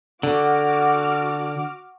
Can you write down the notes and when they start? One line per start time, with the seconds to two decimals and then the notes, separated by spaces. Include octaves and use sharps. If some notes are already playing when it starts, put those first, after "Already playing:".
0.23 D3 F#4 D6 F6